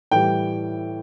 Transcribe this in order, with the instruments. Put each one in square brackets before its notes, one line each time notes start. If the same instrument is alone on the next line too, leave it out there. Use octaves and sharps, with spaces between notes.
[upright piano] A2 E3 G3 G5